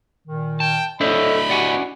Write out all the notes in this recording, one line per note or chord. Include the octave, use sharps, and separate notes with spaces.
A#2 D#3
G5 A5
D4 E4 A4 C5 C#5 D#5 E5 B5
F#4 G4 D5 F#5 G#5